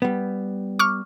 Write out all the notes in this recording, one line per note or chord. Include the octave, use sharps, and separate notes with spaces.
G3 B3
C#6 D6 F6